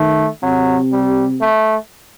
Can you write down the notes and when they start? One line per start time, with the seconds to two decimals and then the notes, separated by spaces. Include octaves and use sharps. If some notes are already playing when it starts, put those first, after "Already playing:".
Already playing: D#3 A3
0.43 C3 F#3
0.92 G3
1.42 A3